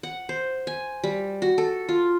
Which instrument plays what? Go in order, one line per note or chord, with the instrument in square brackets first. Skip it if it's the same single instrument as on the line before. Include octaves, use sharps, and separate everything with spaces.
[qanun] F#5
C5
G#5
G3
F#4
A4
F4